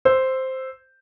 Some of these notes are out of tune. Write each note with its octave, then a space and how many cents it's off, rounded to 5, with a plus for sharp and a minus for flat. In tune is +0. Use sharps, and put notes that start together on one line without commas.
C5 +0 E6 +0